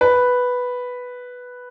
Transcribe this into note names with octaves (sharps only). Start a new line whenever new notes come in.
B4